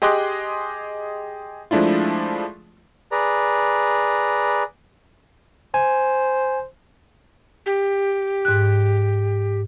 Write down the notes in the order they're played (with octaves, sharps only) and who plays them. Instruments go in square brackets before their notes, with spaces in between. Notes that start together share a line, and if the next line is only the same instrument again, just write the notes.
[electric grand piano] G4 G#4 D#5 C6 D6 F#6
F3 G#3 A3 D4 E4 F4
[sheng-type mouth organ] G#4 B4 D5 A#5
[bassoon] C5 [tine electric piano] G#5
[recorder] G4
[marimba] G#2 F#6